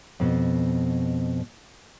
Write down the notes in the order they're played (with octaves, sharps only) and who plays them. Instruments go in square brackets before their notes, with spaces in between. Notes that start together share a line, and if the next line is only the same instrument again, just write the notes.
[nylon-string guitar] F2 B2